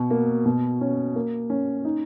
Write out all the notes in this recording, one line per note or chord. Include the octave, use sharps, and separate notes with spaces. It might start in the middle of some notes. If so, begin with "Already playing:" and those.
Already playing: B2
A#3
B2
C#4
A#3
C#4
D#4